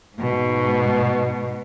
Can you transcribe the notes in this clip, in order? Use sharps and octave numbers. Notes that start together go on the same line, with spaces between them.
G#2 B2